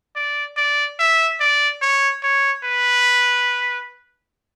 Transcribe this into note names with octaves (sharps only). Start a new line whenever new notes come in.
D5
D5
E5
D5
C#5
C#5
B4